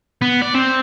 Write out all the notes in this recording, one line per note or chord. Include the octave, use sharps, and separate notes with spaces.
B3
D5
C4